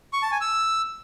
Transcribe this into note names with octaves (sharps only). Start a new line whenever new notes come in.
C#6
A5
G#5
E6